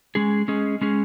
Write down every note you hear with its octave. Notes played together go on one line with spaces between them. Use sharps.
G#3 C#4 G#4
G#3 C#4 G#4
G#3 C#4 G#4